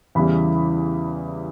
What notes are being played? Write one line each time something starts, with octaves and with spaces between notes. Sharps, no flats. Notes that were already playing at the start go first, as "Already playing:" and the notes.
E2 C#3 E3 G3 B5